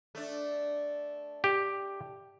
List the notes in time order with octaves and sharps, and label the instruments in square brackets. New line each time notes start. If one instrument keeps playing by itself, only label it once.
[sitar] A3 D4
[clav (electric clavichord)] G4